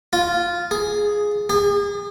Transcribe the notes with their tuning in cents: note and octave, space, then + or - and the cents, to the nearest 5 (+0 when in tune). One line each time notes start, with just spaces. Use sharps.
F4 -5
G#4 +0
G#4 -40